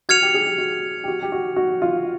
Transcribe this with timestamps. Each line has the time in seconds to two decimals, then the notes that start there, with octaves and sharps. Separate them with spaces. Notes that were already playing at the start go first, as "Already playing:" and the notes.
0.09 F#4 F6 G#6 C#7 F7
0.22 G4
0.34 G#4
0.46 G4
0.58 F#4
1.04 G4
1.08 F#4
1.23 G4
1.32 F#4
1.56 F#4
1.82 F4